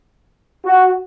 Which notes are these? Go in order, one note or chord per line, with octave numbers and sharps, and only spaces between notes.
F#4